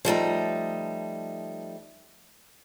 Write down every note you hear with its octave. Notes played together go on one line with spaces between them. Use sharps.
F3 G3 A3 D#4